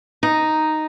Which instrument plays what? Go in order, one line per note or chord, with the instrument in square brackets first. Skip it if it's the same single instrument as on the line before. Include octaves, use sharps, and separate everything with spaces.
[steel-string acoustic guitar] D#4